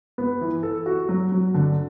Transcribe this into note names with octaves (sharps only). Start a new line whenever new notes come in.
B3
E3
A4
F#4
F#3
F#3
D3